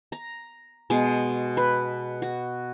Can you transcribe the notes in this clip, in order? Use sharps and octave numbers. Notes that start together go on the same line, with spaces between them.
A#5
B2 G#3
B4
F#4